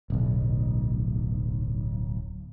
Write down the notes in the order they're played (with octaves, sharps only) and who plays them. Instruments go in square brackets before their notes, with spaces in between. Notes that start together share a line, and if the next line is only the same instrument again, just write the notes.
[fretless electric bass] D1 B1